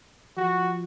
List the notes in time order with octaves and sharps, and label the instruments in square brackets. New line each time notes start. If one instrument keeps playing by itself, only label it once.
[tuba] F3 [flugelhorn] F#4